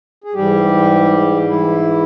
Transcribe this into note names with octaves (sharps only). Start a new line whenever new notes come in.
G#4
G#2 E3 G3 G4
E3 E4